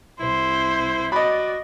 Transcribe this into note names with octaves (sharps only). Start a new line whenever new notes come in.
C2 E4 C5
F#4 D5 D#5 B5